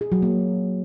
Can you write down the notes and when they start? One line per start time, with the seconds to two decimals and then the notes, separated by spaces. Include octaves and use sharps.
0.01 G#4
0.12 F#3
0.22 A#3